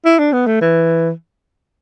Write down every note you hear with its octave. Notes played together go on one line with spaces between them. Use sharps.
E4
D4
B3
A3
E3